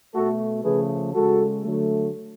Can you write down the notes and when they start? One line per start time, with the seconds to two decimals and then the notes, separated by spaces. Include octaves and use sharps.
0.14 B2 A3 F#4 A4
0.64 C#3 F3 A3 G#4 B4
1.13 C#3 G#3 F#4 A4
1.63 D3 F#3 A3